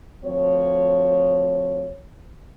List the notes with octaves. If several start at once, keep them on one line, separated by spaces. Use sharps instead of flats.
D2 F3 C4 C#5